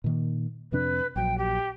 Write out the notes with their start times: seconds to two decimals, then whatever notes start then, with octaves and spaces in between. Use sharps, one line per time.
0.04 A#2 D#3 A#3
0.72 F2 C3 D4 B4
1.16 A#1 F#3 G5
1.38 G4